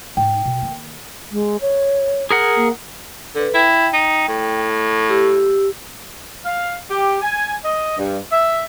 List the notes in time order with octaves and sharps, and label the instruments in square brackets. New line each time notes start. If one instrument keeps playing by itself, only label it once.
[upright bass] G#2 D#4 [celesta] G5
[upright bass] B2
D#3 A#3
[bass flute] G#3
C#5
[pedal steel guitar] G#4 A#4 F#5
[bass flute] A#3
[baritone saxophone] D3 [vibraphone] A4 B4
[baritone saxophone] E4 [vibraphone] G5
[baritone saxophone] D#4
A2
[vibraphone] G4 E6
[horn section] F5
G4
G#5
D#5
G2
E5